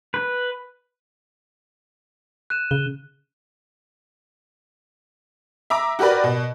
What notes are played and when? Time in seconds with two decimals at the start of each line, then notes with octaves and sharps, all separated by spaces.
0.14 B4
2.50 F#6 D#7 E7
2.71 C#3 G7
5.70 E5 A#5 D6
5.99 F#4 G4 A#4 B4 D5
6.24 B2